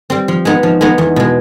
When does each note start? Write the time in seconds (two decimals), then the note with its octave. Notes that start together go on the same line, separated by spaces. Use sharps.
0.10 G3 C4
0.28 F3
0.45 G#3 B3 D#4
0.63 F3
0.81 G#3 B3 D#4
0.98 E2
1.16 B2 G#3